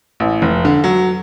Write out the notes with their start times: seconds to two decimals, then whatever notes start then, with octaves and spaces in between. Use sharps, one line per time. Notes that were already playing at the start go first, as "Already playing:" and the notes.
0.20 A1
0.42 F1
0.65 D3
0.84 F#3